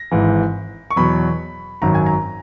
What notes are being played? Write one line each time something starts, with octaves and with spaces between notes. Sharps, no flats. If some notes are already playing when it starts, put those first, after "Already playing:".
Already playing: A#6
G#1 G#2 E3
C#6
E2 B2 F#3 B5
G#1 F#2 D#3 F#3 A#5
G#5
A#5